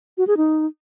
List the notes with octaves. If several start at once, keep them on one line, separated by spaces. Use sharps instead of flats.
F#4
G#4
D#4